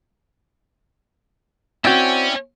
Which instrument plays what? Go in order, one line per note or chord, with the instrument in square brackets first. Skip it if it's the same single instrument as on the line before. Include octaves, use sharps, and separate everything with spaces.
[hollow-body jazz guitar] C4 F#4 [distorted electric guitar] C#4 [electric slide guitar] E4 D5 G5